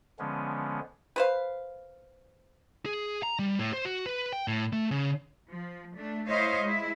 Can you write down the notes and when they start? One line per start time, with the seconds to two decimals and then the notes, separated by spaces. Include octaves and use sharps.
0.19 D3 F3 G#3 B3 C#4
1.16 B4 C5 F5
2.86 G#4
3.23 A#5
3.39 G3
3.59 A2
3.73 C5
3.85 F#4
4.06 B4
4.33 G5
4.48 A2
4.73 A3
4.91 C#3
5.48 F3
5.95 A3 D4
6.28 A3 E4 C5 C#5 D#5 F5
6.62 G#3 E4